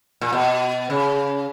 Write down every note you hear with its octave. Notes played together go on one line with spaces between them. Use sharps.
A#2
B2
C#3